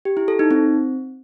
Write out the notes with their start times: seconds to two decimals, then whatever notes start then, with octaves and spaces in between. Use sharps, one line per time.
0.05 G4
0.17 E4
0.28 A4
0.39 D#4
0.51 C4